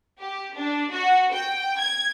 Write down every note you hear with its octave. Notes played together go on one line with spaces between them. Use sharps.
G4
D4
F#4
G5
G#6